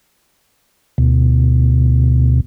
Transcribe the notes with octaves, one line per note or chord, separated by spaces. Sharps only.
D2 B2